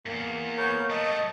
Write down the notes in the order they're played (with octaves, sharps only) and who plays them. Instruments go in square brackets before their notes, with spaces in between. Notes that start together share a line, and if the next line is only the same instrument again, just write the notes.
[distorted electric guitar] E2 G2 [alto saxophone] A#3
[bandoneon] B3 A#4 C#5 [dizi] G6
[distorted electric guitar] F#3 A3 [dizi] D#5 [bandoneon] A5